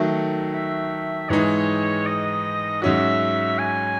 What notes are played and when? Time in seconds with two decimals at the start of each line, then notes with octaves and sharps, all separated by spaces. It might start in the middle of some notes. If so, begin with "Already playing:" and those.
Already playing: D#3 F#3 A3
0.54 E5
1.29 G#2 E3 G#3 D#4 C#5
2.06 D#5
2.82 G#2 F#3 C#4 F#4 E5
3.59 G#5